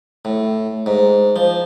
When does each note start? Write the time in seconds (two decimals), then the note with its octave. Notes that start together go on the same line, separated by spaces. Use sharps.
0.25 A2
0.86 G#2
1.36 F3